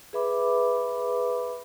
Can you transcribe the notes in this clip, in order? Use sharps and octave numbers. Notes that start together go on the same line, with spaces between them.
G#4 B4 E5 B5 D6